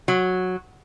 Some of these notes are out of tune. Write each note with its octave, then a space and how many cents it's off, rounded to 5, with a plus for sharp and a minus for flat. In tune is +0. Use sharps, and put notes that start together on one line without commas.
F#3 -10